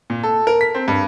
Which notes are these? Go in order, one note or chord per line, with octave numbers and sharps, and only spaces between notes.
A#2
A4
A#4
B6
C4
G2